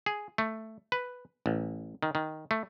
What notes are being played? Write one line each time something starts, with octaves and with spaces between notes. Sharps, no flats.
G#4
A3
B4
A1
D#3
D#3
A3